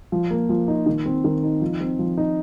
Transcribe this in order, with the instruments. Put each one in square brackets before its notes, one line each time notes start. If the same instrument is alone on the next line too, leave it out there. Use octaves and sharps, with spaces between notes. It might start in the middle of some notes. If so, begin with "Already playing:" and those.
[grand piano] F3
A#3
F3
D#4
D#3
C4
D#3
D#4
F3
C4
F3
D#4